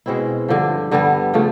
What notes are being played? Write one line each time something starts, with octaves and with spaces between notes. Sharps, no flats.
B2 G#3 C4 E4
G2 D3 F3
G2 D3 G3 B3
C#3 F3 A3